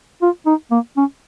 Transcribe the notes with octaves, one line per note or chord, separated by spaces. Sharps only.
F4
D#4
A#3
C#4